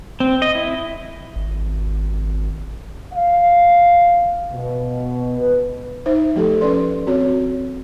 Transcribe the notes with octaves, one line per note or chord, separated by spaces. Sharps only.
C4
D#5
E4
G#1
F5
B2
B4
D#4 C5 E5
F3 A3 G4 A4
C#4 B4 D5 C6
C4 F#4 C#5